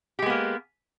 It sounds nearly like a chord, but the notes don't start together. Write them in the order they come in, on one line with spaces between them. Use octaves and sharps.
G4 G#3 B3 A#3